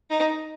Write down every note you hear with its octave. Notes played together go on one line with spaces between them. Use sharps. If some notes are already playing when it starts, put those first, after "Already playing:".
D#4